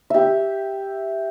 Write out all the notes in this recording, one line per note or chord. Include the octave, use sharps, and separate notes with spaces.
G4 E5